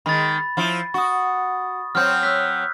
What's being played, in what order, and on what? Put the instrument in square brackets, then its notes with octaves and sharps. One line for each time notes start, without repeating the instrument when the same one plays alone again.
[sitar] D#3 G#3 [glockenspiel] B5 A6
[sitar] F3 E4
[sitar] F#4 [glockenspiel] C#6 D#6
[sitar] F#3 C4 [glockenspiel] F6 G6
[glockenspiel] E6 F#6 B6